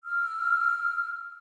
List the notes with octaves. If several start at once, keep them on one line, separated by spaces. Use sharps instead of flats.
E6 F6